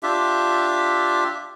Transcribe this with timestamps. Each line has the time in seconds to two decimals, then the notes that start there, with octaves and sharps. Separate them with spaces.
0.03 D4 F4 G4 E5